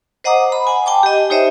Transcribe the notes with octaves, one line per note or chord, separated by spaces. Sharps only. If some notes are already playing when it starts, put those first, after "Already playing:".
C5 D#5 F#5 A#5 D6 D#6
B5
F#5 G#5
G5 A5 D6
G4 D#5
D#4 G4 C5 C#5 D#5 E5